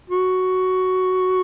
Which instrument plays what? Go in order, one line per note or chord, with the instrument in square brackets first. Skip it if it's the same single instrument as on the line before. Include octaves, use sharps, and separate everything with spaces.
[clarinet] F#4